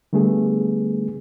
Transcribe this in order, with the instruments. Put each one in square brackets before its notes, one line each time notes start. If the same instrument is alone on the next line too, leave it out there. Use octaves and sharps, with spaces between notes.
[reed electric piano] D3 G3 A3 B3 G#4